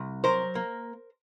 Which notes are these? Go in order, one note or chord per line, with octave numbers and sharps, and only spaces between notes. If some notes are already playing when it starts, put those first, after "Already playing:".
Already playing: C2
F#3 A#4 C5
A#3